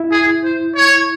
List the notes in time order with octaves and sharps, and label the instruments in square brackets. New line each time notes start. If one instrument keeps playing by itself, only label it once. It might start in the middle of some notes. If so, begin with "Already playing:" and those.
Already playing: [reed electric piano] E4
[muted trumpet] G#4
C5
C#5